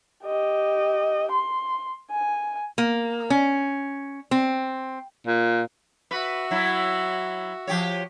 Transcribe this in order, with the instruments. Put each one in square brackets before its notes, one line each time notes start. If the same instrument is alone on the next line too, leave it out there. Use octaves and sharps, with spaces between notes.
[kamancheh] G4 D#5
C6
G#5
[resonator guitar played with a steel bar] A#3
C#4
C4
[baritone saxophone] A#2
[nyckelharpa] F#4 E5 [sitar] B4
[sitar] F#3 E4
F3 G4 C#5